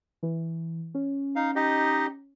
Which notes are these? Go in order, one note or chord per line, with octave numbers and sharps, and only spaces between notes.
E3
C#4
D#4 F5
D#4 G4 D#5